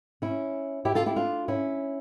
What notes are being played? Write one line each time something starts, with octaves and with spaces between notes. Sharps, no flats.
C#4 E4
E4 G4
F4 A4
E4 G4
D4 F4
C#4 E4